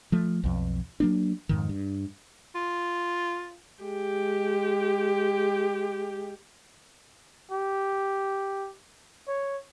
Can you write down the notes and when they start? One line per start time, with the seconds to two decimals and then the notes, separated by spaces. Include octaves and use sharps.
0.12 F3 A3
0.43 B1 F2
1.00 F#3 A#3 D4
1.49 F2 G#2 D#3
1.69 G2
2.55 F4
3.83 G#3 G4
7.52 G4
9.28 C#5